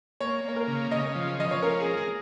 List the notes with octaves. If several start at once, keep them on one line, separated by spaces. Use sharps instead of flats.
A#3 C#5
A#3 C#5
A#4
C#3
C#3 D#5
F3
F3 D#5
C#5
C#4 A#4
G#4
A#4
G#4